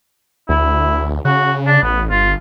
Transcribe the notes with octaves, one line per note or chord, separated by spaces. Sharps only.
D2 E4
C#3 F#4
D4
A1 B3
G1 F4